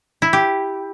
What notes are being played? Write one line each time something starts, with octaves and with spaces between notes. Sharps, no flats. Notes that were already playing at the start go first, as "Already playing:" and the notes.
E4
G4